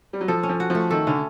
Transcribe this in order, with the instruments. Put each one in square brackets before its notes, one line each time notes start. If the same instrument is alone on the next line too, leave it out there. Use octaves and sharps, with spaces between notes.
[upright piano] G3
F#3
[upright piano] F3 [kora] A4
[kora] C#4
[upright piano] F3
[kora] F#4
[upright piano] F3 [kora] A3
[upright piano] D#3 [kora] A4
[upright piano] D3 [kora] C#4